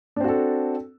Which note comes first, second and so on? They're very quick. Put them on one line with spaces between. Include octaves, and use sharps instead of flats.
D4 C4 F#4 A4